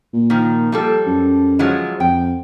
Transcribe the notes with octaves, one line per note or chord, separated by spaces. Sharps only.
A#2
D#3 F3
F3 G3 A4
F#2
F3 F#3 G#3
F2 G5